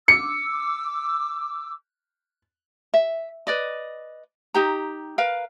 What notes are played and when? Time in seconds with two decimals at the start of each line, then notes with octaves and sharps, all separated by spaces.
0.08 D6 E6 C#7
2.94 E5
3.47 B4 D5 D#5
4.54 D#4 G4 A#5
5.18 A#4 B4 F5